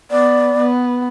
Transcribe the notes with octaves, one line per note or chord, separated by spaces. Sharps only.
B3 D5
B3